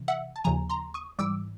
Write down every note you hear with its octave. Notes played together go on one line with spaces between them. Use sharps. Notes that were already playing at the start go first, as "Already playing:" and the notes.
Already playing: C3 E3
E5 F#5
A5
D#2 C#3 F3 G#5 A#5
A#5 C6
C#6 D#6
G#2 E3 G3 D6 E6